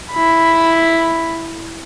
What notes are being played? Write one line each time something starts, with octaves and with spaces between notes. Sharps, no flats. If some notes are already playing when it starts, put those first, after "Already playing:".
E4 B5